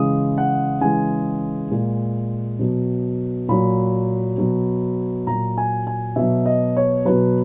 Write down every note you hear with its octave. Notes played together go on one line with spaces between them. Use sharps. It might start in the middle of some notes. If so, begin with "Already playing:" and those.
Already playing: C#3 E3 G#3 D#6
F#5
C#3 E3 G#3 G#5
A#2 G#3
B2 F#3
A#2 F#3 B5
B2 F#3
A#2 F#3 A#5
G#5
G#5
B2 F#3 E5
D#5
C#5
B2 F#3 B4